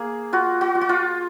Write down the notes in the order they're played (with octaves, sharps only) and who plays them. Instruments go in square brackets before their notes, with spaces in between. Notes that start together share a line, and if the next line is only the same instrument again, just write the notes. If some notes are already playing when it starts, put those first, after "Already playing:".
Already playing: [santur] A#3 G#4
F4 F#4
F#4
F4
F#4
F4